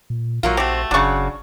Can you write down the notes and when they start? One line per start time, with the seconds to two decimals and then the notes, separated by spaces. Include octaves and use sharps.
0.10 A#2
0.43 A#1 F#3 A#3 F4
0.57 A3 C4 F#4 G4
0.91 F#1 C#3 F#3 D4 C#6